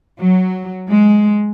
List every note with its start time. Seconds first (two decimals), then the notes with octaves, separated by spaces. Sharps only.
0.20 F#3
0.89 G#3